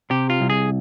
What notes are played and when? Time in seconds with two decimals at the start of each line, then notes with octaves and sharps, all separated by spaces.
0.10 C3 G4
0.30 F4
0.41 C2
0.50 G#4